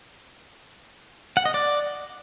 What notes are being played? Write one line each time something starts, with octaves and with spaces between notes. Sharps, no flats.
F#5
D#5
D5